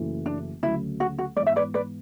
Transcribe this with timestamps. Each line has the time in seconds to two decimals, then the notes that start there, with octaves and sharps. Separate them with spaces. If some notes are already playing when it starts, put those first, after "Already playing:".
Already playing: F#1 F#2 E3 A3
0.26 D4
0.62 D2 C#3 F#3 A3 E4
1.00 F#4
1.19 F#4
1.36 G#2 E3 B3 D5
1.46 E5
1.56 B4 D5
1.74 B4 D5